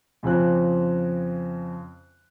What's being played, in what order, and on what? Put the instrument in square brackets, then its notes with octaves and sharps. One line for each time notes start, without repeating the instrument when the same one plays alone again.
[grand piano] F2 C#3 F3 C4 F#6